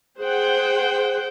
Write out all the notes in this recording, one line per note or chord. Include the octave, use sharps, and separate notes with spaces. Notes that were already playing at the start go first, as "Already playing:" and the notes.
G#4 C5 F#5 G5